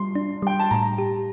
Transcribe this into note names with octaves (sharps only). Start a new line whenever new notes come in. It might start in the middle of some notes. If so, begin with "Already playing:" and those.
Already playing: G3 C6
D4
G3 G5
A5
A2 A#5
G4